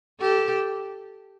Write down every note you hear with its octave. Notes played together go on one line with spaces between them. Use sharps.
G4 A4